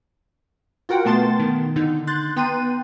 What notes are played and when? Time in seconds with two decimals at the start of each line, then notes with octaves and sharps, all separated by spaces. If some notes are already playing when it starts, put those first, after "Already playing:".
0.89 F4 F#4 A#4 F#5 G5
1.05 B2 A3 B3 A5 C6 A6
1.40 D#3
1.76 D3 D#4
2.07 C6 F#6 G6 A6
2.36 B3 G5 A#5 C6 F#6 D#7